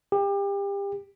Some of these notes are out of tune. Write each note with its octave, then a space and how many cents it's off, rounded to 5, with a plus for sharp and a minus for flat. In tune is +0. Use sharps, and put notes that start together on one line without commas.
G4 +30